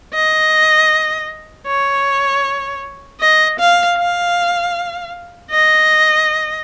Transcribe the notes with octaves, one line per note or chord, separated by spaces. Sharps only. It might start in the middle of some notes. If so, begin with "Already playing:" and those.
D#5
C#5
D#5
F5
F5
D#5